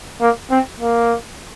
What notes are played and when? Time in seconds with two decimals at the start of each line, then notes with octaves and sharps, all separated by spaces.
0.21 A#3
0.50 C4
0.80 A#3